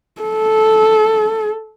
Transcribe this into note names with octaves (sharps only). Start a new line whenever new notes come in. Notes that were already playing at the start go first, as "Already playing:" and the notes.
A4